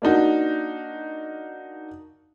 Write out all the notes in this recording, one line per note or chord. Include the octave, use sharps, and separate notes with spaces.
A#3 D4 D#4 F#4